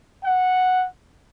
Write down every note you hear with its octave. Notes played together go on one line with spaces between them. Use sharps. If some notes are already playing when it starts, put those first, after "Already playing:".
F#5